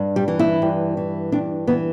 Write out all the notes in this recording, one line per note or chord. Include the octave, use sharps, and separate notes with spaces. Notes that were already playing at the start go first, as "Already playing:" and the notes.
Already playing: G2
G3
E3
E4
G2
E3
G2 D4
E3 B3